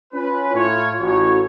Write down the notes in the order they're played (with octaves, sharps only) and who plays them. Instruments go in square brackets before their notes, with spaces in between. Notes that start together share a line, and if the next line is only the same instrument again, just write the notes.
[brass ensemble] C#4 B4 [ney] F4
[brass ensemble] A2 C#5 [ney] F4
[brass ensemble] A1 C#5 [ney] F#4